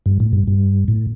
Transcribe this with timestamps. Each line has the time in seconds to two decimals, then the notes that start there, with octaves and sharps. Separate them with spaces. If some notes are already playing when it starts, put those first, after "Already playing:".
0.06 G2
0.20 A2
0.33 G2
0.48 G2
0.88 A2